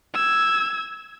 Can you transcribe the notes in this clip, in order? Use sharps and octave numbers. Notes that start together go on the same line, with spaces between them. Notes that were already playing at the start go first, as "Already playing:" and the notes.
E6 G#6